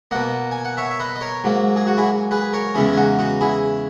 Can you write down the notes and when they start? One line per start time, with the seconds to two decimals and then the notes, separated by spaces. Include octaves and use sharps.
0.11 B2 A#3 D#5 F#5
0.51 G#5
0.65 F#5
0.77 C#5 E5
0.90 E5
1.00 B4 D#5
1.15 D#5
1.21 A#4 C#5
1.44 G#2 F#3 A#3
1.76 G#4
1.87 F#4
1.97 E4 G#4
2.31 G#4 B4
2.53 A#4 C#5
2.74 E2 C#3 E3 G#3 E4 G#4
2.92 G#4
2.97 D#4 F#4
3.19 D#4 F#4
3.41 E4 G#4